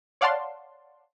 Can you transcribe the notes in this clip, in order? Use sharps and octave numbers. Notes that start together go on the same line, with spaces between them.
C#5 D5 F5 F#5 A5 C6